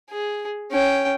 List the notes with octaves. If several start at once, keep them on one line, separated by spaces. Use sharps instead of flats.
G#4
C#4 G5